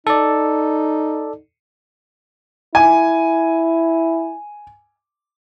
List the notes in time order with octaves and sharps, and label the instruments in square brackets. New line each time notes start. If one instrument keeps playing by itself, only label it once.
[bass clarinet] D#4 [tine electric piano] A4 D5
[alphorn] E4 [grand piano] G#5